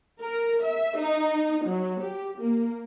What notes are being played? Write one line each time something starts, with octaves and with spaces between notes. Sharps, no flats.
A#4
E5
D#4
F#3
G4
A#3